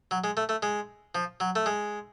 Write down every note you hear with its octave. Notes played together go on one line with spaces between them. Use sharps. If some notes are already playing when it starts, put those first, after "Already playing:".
F#3
G#3
A3
A3
G#3
F3
F#3
A3
G#3